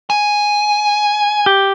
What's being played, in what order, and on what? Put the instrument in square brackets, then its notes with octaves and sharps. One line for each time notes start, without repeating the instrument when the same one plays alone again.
[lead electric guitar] G#5
[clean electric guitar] G4